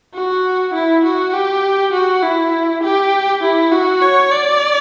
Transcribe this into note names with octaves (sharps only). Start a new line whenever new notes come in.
F#4
E4
F#4
G4
F#4
E4
G4
E4
F#4
C#5
D5